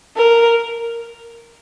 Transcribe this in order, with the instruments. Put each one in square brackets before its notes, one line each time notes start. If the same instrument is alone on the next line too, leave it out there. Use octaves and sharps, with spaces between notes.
[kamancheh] A#4